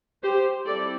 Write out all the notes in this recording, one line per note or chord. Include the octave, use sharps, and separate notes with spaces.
G4 C5
G3 C4 E4 A4 D5